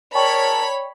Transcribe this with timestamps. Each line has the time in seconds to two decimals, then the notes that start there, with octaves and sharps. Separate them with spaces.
0.15 A#4 C#5 D5 G5 A5 B5 C#6